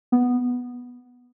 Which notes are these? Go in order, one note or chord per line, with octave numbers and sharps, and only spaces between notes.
B3